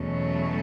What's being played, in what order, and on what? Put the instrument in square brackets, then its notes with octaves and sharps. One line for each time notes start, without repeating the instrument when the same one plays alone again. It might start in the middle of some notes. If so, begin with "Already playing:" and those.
Already playing: [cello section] E2 B2 F#3 A3 C#4